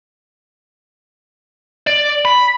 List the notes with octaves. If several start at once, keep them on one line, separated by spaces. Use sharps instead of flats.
D5
B5